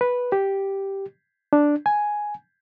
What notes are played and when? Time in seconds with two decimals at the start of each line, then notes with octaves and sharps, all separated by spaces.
0.01 B4
0.32 G4
1.53 D4
1.86 G#5